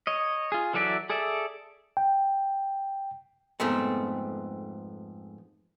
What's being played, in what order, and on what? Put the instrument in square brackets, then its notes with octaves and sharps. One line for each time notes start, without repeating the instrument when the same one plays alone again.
[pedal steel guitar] C#5 D#5
F4 G#4
E3 F#3 A4 D5 E5
G#4 A4 D5 E5
[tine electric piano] G5
[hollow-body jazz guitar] F2 G#2 A3 B3 C4